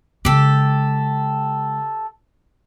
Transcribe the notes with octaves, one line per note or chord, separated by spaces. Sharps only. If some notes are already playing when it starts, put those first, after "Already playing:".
C#3 G#3 G4 A4